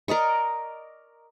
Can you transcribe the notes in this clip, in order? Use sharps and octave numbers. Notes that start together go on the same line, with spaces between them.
A#4 D5 D#5 C#6